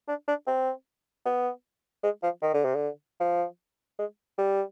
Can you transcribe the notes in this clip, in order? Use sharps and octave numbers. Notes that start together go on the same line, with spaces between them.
D4
D4
C4
B3
G#3
F3
D#3
D3
C3
D3
F3
G#3
G3